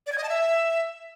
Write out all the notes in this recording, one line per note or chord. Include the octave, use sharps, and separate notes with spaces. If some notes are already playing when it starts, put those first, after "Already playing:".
D5
G#6
D#5
A5
E5